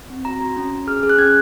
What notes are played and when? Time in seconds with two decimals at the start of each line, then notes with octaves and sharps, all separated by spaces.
0.10 C4
0.25 F#4 A#5
0.40 F#4
0.57 C#4
0.72 C#4
0.87 G#4 F6
1.03 G#4
1.09 F#6
1.18 C#4 G#6